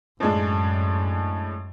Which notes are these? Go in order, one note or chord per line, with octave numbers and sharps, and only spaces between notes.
F#2 A2 G#3 D4